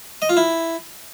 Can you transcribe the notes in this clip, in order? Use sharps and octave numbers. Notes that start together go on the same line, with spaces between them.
D#5
F4
E4